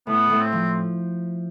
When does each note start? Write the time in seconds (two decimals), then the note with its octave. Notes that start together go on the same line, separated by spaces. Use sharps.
0.07 A2 B3
0.30 A2
0.40 C4
0.52 F3